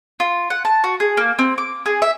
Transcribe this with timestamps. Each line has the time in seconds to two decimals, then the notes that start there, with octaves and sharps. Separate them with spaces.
0.20 F4
0.50 F#5
0.65 A5
0.84 F#4
1.00 G#4
1.17 A#3
1.39 C4
1.58 D6
1.86 G#4
2.02 E5